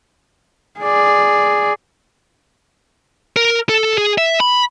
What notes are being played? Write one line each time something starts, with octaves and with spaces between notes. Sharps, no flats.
G#4 D5
A#4
A4
G#4
E5
B5